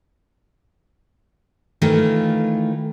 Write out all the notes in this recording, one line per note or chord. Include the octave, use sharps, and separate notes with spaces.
D#3 E3 A3 F4